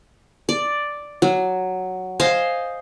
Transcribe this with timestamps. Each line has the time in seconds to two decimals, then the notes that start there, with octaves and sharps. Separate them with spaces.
0.49 D5
1.22 F#3
2.20 C5 D#5 F5 G#5